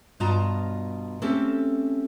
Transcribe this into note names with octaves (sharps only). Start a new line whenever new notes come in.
G2 B2 F4 D#5 A5 A#5
A3 C4 C#4 G4 A4